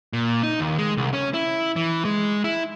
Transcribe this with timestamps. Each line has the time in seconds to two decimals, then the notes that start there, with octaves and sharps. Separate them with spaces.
0.13 A#2
0.43 D#4
0.60 D#2
0.78 G#3
0.97 C2
1.14 C#4
1.34 E4
1.76 E3
2.05 G#3
2.44 E4